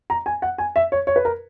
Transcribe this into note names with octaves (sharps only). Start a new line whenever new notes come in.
A#5
G#5
F#5
G#5
E5
C#5
C#5
B4
A#4